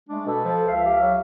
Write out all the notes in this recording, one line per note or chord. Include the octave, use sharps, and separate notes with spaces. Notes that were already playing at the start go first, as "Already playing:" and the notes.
G#3 A3 D4
B2 A4 B4
F3
C#2 E5 F5
G4
F#3